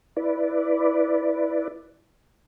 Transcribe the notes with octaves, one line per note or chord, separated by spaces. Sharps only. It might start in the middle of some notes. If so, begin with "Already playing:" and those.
E4 B4 D5